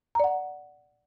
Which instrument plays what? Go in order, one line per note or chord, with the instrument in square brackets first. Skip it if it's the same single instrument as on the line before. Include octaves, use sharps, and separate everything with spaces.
[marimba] A#5
D5
F#5